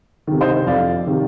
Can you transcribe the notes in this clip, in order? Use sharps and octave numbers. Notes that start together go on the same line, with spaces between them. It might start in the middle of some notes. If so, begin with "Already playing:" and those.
C3 D#3
C5 D#5
F2 D5 F5
C3 D#3